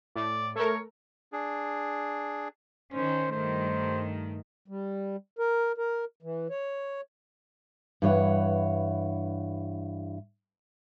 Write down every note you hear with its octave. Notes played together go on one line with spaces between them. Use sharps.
A2 D5
A3 A4 A#4 C#5
D4 G#4
D#3 C#4 C5
G2 D#3 A3 C5
G3
A#4
A#4
E3
C#5
G2 E3 C#5 F#5